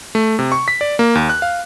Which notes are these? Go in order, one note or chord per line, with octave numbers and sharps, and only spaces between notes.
A3
C3
C#6
B6
D5
A#3
D#2
F#6
F5